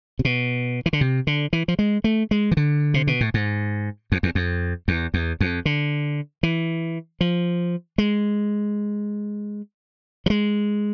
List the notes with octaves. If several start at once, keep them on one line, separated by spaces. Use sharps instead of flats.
C3
B2
E3
D3
C3
D3
E3
F3
G#3
A3
G#3
E3
D3
C3
B2
A2
G#2
F2
E2
F2
E2
E2
F2
D3
E3
F3
G#3
F3
G#3